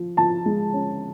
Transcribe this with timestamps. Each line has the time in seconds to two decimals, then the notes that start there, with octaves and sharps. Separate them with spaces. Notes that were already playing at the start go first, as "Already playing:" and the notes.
Already playing: F3
0.17 F3 A5
0.46 G#3
0.73 C#4